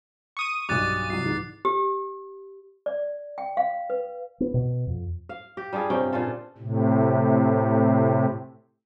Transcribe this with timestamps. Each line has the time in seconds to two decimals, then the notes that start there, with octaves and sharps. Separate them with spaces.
0.37 C#6 D#6 D#7
0.69 B1 G2 D6 F#6 A6
1.10 C2 F#3 C7
1.25 G#2 E3
1.65 G4
2.86 D5
3.38 G5
3.57 F5
3.90 B4
4.40 B3
4.54 B2
4.87 F2
5.29 F5
5.57 G4
5.73 G3 D4 F4 G#4
5.90 G2 C3 C#4 G5
6.12 A#2 C#3 F4 A4
6.58 A2 C3